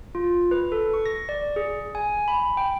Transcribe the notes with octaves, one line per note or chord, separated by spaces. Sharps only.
F4
B4
A4
C#6
A#6
D5
G#4
G#5
B5
G5